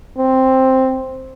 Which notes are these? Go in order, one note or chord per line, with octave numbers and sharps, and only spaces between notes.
C4